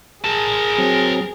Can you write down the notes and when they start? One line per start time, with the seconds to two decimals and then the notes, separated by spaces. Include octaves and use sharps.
0.25 G#4 A#4 A5
0.78 F#3 C4